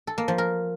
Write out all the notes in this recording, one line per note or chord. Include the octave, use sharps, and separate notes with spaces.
A4
A#3
F3
A#4